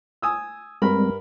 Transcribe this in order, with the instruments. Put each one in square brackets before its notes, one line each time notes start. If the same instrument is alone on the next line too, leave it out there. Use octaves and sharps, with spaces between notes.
[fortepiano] G#5 D#6 E6
[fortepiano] G2 A#4 B5 [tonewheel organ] G3 G#3 C4